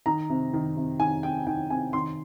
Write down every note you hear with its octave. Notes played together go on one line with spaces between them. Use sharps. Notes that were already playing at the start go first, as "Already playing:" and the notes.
D#3 A#5
C3
D#3
C3
D#3 G#5
C3 G5
D#3 G5
C3 G#5
D#3 C6